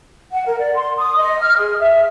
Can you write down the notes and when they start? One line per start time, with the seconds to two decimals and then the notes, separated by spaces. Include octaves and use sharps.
0.31 F#5
0.45 A#4
0.58 D5
0.75 C6
0.97 D#6
1.17 D#5
1.40 F6
1.57 G#4
1.80 E5